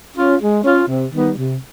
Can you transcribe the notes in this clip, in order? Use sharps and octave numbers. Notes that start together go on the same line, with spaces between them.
C#4 F4
G#3
C#4 F4
C3
D#3 G3 B3 D#4
C3